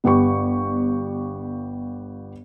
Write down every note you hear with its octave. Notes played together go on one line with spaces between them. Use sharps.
G1 B3 G4 C#6